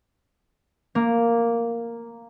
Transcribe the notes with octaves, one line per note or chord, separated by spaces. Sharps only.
A#3